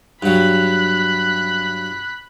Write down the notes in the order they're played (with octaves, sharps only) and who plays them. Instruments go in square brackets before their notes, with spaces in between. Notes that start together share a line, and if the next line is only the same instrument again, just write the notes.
[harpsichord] G2 F#3 [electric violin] B5 F#6